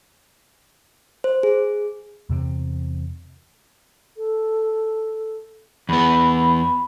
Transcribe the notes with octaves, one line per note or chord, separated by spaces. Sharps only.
C5
G#4
E2 C3 A3 C4
A4
E2 B3 B5